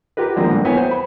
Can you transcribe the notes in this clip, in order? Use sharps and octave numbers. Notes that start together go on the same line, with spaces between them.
F4 G4 A#4 B4
D3 D#3 F3 G#3 A#3 C4
G2
A#3 B3 E4 C#5 G5 G#5
C5
B5